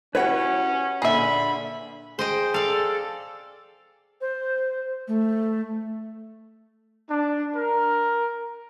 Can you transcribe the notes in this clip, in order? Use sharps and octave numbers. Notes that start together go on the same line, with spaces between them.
C#4 E4 F#4 G4 B4 C#5 F#5
A#2 D3 G#4 E5 B5
G#4 C5 D#5 G5
A4 D5 F5
C5
A3
D4
A#4